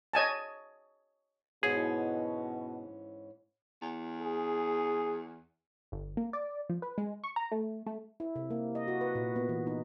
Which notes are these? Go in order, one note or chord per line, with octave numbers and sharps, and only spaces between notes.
C#5 D#5 G#5 A5
G#2 B2 E3 C#4 G#4
E2
G#4
G1
A#3
D5
F3
B4
G#3
C#6
A#5
A3
A3
E4
C3
A#3
D#5
F#4
B4
A#2
B3
E3
D#4